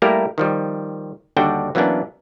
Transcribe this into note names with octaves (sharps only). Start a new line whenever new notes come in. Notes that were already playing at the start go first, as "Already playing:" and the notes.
G3 A3 A#3 E4 G4 A#4
D#3 F3 G3
D#2 D3 G3 D4 F#4 G5
E3 F#3 A#3 B3 C#4 D4